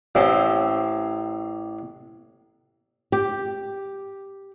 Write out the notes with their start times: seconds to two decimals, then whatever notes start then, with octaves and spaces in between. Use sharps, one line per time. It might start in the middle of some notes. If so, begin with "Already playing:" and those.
0.15 A1 C4 C#4 C6
3.12 G4